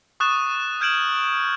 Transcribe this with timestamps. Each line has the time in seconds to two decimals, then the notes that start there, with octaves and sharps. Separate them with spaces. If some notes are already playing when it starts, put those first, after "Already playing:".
0.20 C#6 D#6 F#6 A6 E7
0.81 F6 G6 G#6 D7 E7 F#7